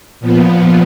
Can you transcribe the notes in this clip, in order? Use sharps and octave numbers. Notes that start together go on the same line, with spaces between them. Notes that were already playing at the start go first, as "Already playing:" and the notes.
A#2 F3 B3